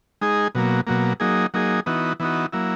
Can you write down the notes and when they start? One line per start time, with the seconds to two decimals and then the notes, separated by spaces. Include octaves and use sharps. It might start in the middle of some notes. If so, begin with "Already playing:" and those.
0.21 G#3 D#4 G#4
0.55 B2 F#3 A#3
0.87 B2 F#3 A#3
1.20 F#3 A#3 D#4 G#4
1.54 F#3 A#3 D#4 G#4
1.86 E3 B3 D#4 F#4
2.20 E3 B3 D#4 F#4
2.53 F#3 A#3 E4